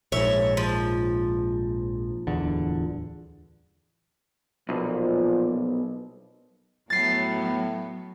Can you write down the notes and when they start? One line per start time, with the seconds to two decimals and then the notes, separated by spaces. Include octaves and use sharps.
0.12 A#1 G#2 C#5 E5
0.57 F3
2.27 D1 E2 D3
4.69 B1 A#2 F3
6.90 A2 F#3 B3 A6 C7